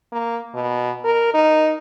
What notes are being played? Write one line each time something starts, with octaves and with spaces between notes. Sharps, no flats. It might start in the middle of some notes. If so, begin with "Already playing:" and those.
A#3
B2
A#4
D#4